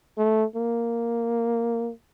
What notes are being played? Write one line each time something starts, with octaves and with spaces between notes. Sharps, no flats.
A3
A#3